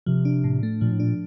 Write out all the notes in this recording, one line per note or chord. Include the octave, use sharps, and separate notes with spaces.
C3 F3
D4
A2
A3
A#2 F3
A2
A#2 D4